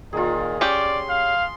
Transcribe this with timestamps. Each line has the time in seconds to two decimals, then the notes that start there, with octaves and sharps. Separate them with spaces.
0.13 A#2 D#3 F4 G#4
0.61 C#4 G4 D5 C6
1.10 F5